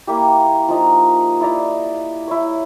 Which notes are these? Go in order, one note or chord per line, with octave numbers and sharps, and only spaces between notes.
A#3 E4 G4
F3 D#4 F5
E4 D5 A#5
E4 C#5